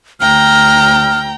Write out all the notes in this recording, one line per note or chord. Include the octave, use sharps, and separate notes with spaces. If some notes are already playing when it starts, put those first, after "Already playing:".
D2 G5 A#5 F6